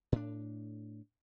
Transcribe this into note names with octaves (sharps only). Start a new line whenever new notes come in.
A2 D4